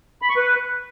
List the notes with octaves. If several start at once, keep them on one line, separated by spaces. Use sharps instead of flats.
B5
C#6
B4